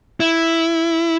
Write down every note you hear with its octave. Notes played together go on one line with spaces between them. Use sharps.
E4